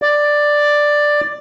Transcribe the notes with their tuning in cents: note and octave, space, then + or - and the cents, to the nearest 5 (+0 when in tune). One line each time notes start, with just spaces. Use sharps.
D5 +5